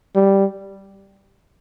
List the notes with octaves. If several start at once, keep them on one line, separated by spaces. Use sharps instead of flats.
G3